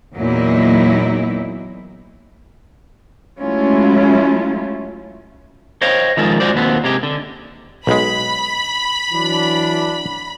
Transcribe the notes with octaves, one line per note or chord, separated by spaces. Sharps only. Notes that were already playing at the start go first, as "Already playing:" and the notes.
E2 A#2 F#3 A#3 D#4 E4
F#3 G#3 A3 C#4 E4 F4
C5 C#5 D#5 F5 G5
D#3 F3 G#3 D#4 F4 A4
G#3 F4 F#4 C5 D5
D#2 B2 B3 C4
C3 G#3 G4
D3
B1 G#3 B5
E3 F#3 D4